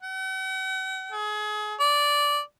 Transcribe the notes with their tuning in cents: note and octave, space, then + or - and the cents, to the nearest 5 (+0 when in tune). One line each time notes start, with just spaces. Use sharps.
F#5 +45
G#4 +30
D5 -10